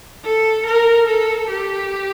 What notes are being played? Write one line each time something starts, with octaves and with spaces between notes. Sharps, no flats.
A4
A#4
A4
G4